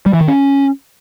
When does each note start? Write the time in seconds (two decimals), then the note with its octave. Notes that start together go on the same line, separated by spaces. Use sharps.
0.06 G3
0.13 E3
0.21 D#3
0.28 C#4